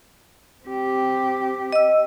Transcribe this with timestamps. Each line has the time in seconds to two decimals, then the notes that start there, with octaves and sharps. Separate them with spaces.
0.65 C4 G4
1.73 D#5 E6